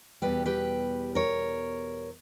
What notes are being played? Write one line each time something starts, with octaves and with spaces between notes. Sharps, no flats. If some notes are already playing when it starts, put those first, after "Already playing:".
E2 B2 G3 G4 B4
G4 B4
A#4 C#5